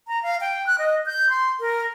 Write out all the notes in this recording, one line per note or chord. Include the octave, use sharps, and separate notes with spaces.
A#5
F5
G5
F#6
D#5
G6
C6
A#4